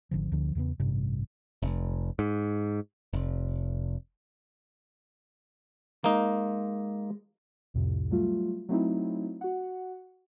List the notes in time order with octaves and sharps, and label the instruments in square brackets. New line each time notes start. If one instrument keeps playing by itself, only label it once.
[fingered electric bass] G#1 D3 F3
D2 D3 F3
E2 C#3 A3 B3
A1 G2 C3 G3
[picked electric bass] F1
G#2
F1
[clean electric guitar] G#3 [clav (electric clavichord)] A#3 D#4
[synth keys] C2 F2 A2 C3
F#3 G3 A3 F4
F#3 A3 C4 D#4 E4
F#4 F#5